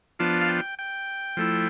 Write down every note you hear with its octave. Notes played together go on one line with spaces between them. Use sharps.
F3 B3 D4 F4 A5
F5
G5
G5
F3 A3 E4